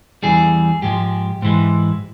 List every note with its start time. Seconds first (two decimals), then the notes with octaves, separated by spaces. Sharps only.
0.23 E2 E3 G3 G#4
0.82 G#2 F3 G#3 G4
1.42 G#2 E3 G#3